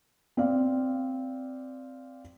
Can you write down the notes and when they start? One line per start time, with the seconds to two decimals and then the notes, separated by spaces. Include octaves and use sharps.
0.37 C4 D5 F5